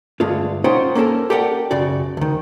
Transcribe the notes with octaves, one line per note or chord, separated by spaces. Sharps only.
G2 D3 G#3 A3 F4
C#4 D#4 F4 C5 F#5 G5
A#3 C#4 D#4 A4 A#4
G4 A4 A#4 D5 F#5 G5
B1 F#2 C#3 F#4 D5
D2 D#3